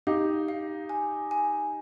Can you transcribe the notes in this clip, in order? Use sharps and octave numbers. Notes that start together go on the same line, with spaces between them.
D#4 G4 F5
F5
G#5
G#5